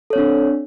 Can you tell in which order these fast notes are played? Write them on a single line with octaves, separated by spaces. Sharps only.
A4 C#5 C4 D4